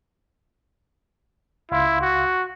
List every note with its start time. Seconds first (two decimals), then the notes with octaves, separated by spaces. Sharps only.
1.71 C#2 E4 F5 C6
2.01 F#4